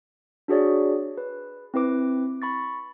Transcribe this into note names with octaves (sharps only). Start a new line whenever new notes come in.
D4 F#4 G#4 C#5 D5
B4
C4 E4 B4 D6
B5 C#6 A6